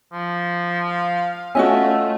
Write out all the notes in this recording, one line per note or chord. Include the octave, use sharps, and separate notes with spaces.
F3
F5
A3 C#4 F4 F#4 D#5 E5 G#5